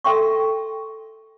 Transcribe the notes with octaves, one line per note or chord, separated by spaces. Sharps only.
A4 A#4 E5 G5 C6 C#6